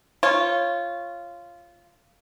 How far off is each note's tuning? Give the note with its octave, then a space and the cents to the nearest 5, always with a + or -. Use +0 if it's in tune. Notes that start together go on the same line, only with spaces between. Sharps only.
F4 -15 C#5 -15